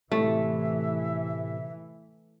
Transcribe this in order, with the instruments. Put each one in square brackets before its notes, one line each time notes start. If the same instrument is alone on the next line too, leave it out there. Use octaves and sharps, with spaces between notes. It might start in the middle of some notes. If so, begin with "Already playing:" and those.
[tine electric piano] A2 C3 [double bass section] E3 [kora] A3 [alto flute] E5